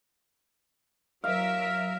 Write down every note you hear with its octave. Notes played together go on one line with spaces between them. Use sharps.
F#3 A#4 E5 F5